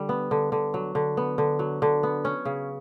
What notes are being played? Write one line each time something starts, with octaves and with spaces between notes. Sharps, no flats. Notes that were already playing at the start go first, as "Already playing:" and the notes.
Already playing: D3 G3
B3
D3
D3
F#3
D3
B3
D3
F#3
D3
B3
C#4
C#3